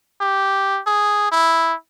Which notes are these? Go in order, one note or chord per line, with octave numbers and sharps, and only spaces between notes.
G4
G#4
E4